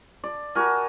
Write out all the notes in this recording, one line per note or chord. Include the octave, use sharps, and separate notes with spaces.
D5
F#4 A#4 G#5